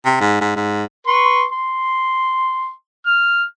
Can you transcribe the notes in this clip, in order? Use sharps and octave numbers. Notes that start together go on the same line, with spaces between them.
C3
G#2
G#2
G#2
B4 C6 C#6
C6
F6